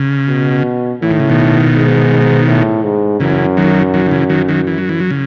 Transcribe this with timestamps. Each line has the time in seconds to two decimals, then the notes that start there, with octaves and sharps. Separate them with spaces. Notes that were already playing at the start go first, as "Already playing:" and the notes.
Already playing: C#3
0.28 B2
1.02 A2 E3
1.11 D#3
1.20 C#3
1.29 B2 D#3
1.75 G#2
2.47 A2
2.83 G#2
3.20 F#2 C#3 E3
3.57 D#3 F#3
3.94 D#3 F#3
4.06 D#3
4.11 C#3 E3
4.29 D#3 F#3
4.48 D#3 F#3
4.67 E3
4.78 F#3
4.89 E3
5.00 F#3
5.10 C#3